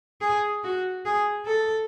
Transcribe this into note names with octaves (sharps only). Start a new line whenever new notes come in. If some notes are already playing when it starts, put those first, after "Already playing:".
G#4
F#4
G#4
A4